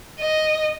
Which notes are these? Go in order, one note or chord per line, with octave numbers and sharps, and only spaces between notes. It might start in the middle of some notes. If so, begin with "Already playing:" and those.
D#5